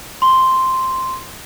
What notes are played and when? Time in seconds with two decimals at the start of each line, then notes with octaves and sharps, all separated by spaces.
0.22 C6